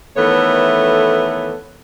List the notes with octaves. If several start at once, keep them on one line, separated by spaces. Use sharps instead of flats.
D#3 E3 A3 B3 A4 C#5